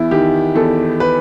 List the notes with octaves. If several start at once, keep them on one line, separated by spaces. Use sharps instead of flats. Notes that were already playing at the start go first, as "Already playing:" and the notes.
Already playing: E2 E4
D#3 G4
E2 A4
B4